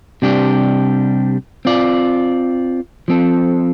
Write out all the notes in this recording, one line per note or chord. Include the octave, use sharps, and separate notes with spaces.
C3 G3 D4 G4
C4 F4 D5
F3 C4 A4